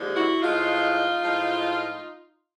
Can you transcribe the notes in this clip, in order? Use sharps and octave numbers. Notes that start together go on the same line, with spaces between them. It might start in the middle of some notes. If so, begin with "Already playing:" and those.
Already playing: D#2 D3 F3 G#3
E4 F#4
A2 F3 G#3 D#4 F4
A2 F3 G#3